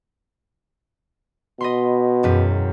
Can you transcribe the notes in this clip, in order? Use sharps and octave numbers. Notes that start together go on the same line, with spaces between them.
B2 D#5 B5 C6
E1 F#2 B4